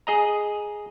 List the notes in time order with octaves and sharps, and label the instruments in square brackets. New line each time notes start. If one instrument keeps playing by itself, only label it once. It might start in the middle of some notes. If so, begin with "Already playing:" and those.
[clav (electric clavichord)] G#4 D#5 A#5